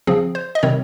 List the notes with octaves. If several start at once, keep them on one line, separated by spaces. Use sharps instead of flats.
C#3 F3 C4 G#4
C5
D#5
C3 D#3 G3 C4 C#5